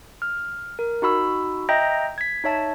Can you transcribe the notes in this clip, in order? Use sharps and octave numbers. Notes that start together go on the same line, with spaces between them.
F6
A#4
D#4 F#4 B5 E6
D#5 E5 G5 A#5 G6 A#6
G#6 B6
D#4 C#5 E5 A5